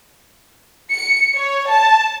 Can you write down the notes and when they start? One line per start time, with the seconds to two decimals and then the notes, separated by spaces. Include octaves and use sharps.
0.91 C#7
1.35 C#5
1.69 A5